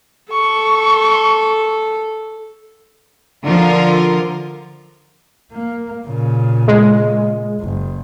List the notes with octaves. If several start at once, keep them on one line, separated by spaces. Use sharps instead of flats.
A4 C#6
D3 F3 F4 A#4
A#3
A#2 C#3
G#3
F#1